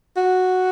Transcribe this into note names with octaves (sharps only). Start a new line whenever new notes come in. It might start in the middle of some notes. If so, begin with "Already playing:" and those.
F#4